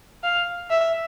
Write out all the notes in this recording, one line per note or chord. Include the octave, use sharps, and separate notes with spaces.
F5
E5